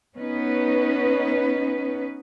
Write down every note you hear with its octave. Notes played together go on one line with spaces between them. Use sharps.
B3 C#4 D#4 B4